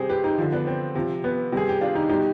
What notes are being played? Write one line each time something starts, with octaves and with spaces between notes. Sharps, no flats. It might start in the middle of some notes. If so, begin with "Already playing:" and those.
Already playing: C3 G3 G#4 C5
G4 B4
D#4 G4
D3 F3
B3 D4
C4
C3 F3
B3
C3 G3 G#4
G4
D4 F4
D#4 G4
B2 G3 D#4 G4